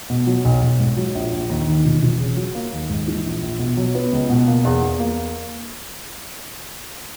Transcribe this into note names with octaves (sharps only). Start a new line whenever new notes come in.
B2
F#3
B1
B1
G#2
F#3
A#1
A#1
D#2
D#3
E1
E1
C#3
F#3
A#3
D#2
G#2
E3
A#1
A#1
B2
F#3
B3
C#2
B2
A#3
E2
E2
A#3